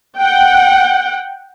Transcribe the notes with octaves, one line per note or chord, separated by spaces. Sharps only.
F#5 G5